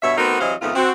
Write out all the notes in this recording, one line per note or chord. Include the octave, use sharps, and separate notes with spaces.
G2 B2 C#5 E5
A3 B3 C4 D#4 F#4 A#4
C3 E3 F#3 C5 D#5 F5
F2 G#2 D#3 A3 B3 F4
C4 F#4